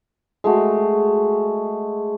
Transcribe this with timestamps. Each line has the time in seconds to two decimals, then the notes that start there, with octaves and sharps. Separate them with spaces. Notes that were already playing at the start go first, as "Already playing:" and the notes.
0.44 G#3 A3 F#4